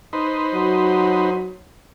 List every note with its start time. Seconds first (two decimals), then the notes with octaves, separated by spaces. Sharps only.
0.13 D#4 B4 C5
0.54 F#3